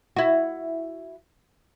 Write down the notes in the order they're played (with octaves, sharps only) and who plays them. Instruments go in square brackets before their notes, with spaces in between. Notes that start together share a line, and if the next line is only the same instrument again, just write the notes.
[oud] E4 F#4